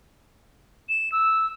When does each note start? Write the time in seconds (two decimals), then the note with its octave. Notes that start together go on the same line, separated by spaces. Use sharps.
0.89 E7
1.12 E6